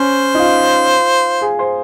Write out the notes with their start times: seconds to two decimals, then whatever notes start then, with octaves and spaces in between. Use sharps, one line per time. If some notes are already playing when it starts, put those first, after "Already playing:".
Already playing: C#4 C5
0.35 D#4
0.39 F4
1.42 G#4
1.59 C5